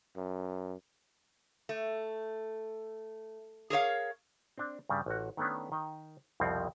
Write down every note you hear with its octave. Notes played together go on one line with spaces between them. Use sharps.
F#2
A3
G#4 A#4 C#5 F5
C4 D4
G2 C#3 G3
A1 F#4
D#3 A3 B3 C#4 D4
D#3 D#5
C2 F2 B2 F3 C4